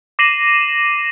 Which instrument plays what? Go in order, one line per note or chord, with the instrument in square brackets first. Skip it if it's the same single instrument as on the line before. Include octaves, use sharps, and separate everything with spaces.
[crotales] D6 A#6 C7 D#7 E7 F#7